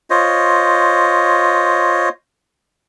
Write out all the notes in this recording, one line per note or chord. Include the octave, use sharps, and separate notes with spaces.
F4 C5 C#5 D#5